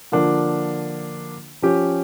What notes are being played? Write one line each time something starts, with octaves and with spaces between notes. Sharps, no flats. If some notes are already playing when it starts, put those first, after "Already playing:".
D3 F3 A#3 D4
F3 C#4 G4